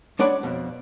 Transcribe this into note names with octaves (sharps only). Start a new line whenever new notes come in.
G#3 D4 C#5 D5 F#5 B5
F2 B2